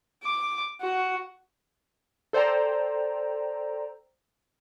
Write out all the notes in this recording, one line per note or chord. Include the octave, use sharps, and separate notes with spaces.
D6
F#4
A4 C5 D5 G5 A#5